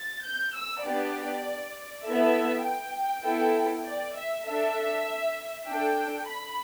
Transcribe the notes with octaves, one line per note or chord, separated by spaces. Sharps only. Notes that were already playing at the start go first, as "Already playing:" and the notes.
Already playing: A6
G6
E6
B3 D4 G4 D5
B3 E4 A4 E5
G5
B3 E4 A4
D5
E5
D4 A4 E5
D4 A4 G5
B5